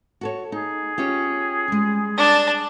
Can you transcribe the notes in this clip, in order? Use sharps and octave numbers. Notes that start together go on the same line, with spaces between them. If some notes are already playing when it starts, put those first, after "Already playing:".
F#4 A4 C#5
D#4 G#4
C#4 F4 G4
G3 G#3
D4 A5